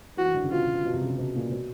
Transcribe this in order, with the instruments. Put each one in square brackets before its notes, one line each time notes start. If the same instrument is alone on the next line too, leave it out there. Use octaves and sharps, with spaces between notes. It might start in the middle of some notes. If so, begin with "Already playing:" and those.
[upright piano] E3 [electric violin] F#4
[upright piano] D#3
D3
C#3
[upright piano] B2 [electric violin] F4
[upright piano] B2
B2
B2
C3
C#3
C3
B2
A#2
B2